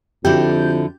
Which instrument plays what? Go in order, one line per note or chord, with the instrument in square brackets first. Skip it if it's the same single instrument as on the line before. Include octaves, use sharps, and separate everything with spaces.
[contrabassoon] F2 [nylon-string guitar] D3 E4 F#4 [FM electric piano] G4 G6